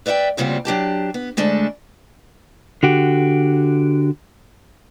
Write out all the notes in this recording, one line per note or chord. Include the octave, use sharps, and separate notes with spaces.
B4 D5 E5 F#5 G5
D2 A#2 C#3 G3 C4 F#4
F#3 D4 G4 A5
B3
D2 G#3 A3 D4 A4
D3 F#4 G4